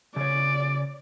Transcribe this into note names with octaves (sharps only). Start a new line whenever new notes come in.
C#3 C#5 D5